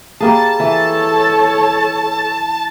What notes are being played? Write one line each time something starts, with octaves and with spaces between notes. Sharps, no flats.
G3 A#3 G#4 A5
E3 A4 C#5